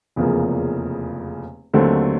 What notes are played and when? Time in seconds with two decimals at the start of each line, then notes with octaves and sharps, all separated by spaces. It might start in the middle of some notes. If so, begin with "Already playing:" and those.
0.16 F1 E2 C#3 F3 A#3
1.74 D#2 D3 F#3 A3 C4